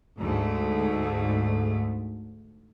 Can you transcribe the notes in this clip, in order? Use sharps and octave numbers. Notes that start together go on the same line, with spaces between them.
D2 G#2 A3